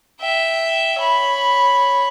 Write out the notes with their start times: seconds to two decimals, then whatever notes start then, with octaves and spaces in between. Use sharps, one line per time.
0.21 E5 G5
0.99 C#5 B5